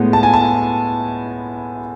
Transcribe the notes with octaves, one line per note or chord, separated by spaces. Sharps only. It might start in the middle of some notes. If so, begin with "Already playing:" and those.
Already playing: A2 G#3 B3
A5
G#5
A5